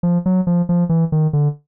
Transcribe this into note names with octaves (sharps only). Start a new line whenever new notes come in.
F3
F#3
F3
F3
E3
D#3
D3